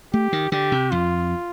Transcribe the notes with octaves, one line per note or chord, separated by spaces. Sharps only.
A3 G4
D#3
D3 G4
C3
F2 F4